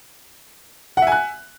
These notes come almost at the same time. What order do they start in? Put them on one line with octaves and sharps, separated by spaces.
F#5 E5 G#5 F#6